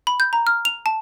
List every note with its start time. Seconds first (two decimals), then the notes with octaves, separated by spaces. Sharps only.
0.07 B5
0.20 G6
0.33 A#5
0.47 F6
0.65 F7
0.86 A5